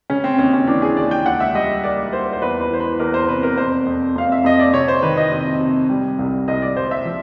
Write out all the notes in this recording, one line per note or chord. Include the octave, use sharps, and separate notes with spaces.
C#3 C#4
C4
D#2 C#4
C#4
E3 D4
G#4
D#2 D5
G5
C#2 F#5
E5
G3 D#5
A#3 D5
A#3 C5
C5
E2 B4
B4
E3 C5
B4
E2 A#4
C5
C3 B4
A#4
F2 C5
F2
F2 F5
E5
F2 D#5
D5
C3 C#5
C5
D#3 B4
D#5
C3 D#5
C3
G3
C2
C2 D#5
D5
C2 C5
E5
F3